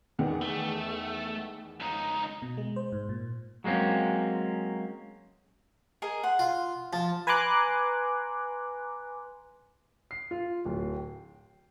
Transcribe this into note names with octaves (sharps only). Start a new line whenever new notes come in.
E2 D#3 B3
A3
C#2 D#4
B2
G#3
C5
G#2
A#2
F#3 G#3 A#3 C4 C#4
G#4 A#4 D#5
F#5 C6
F4
F3 A5
B4 G#5 A#5 C6 D6 F#6
C7
F4
D1
G5